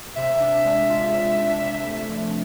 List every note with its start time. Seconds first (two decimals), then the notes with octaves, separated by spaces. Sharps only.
0.16 C3 E5
0.40 D4
0.65 G#3
0.89 F4
1.13 C3
1.38 D4
1.62 C3
1.85 A3
2.10 F3